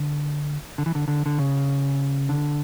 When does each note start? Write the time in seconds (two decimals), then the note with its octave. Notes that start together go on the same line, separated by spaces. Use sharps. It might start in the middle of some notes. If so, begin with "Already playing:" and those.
Already playing: D3
0.78 D3
0.86 E3
0.95 D3
1.08 D3
1.26 D3
1.38 C#3
2.29 D3